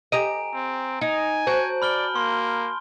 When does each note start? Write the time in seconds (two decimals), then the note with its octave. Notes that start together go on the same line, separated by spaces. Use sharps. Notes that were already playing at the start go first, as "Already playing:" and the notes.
0.12 G4 D#5 G#5 A#5 D7
0.54 C4
1.01 D#4 G#5
1.47 F#4 C5 C#5 A5 G6 D7
1.82 D5 B5 F6 G7
2.15 A#3 C6